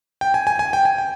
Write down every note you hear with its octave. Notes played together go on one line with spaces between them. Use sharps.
G5
G#5
G#5
G#5
G5
G#5
G5